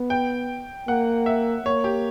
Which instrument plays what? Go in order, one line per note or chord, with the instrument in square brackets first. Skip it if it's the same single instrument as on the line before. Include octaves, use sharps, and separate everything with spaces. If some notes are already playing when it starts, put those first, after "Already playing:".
Already playing: [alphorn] B3
[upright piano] G5
[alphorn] A#3 [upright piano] F#5
[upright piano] E5
[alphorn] A#3 [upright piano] C#5
[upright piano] G4